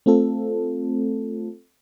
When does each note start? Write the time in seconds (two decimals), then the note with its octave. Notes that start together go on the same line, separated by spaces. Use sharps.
0.06 A3 C4 F4 A4